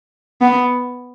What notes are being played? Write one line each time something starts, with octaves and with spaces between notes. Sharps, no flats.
B3